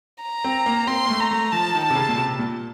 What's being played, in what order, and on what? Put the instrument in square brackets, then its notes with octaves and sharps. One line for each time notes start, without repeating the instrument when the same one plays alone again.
[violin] A#5
[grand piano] C4
A#3
[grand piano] C4 [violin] C6
[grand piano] A#3
A3
[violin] A#5
[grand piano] A3
[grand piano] F3 [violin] A5
[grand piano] D#3
[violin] A5
[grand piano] C3
C#3
A#2
C3
A#2